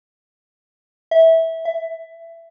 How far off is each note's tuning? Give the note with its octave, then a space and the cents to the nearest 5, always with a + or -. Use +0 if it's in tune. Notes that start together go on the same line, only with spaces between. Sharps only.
E5 -15
E5 +15